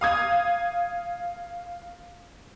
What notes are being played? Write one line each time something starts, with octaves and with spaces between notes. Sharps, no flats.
F5 D#6 G#6